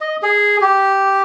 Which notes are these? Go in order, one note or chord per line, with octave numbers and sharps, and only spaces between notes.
D#5
G#4
G4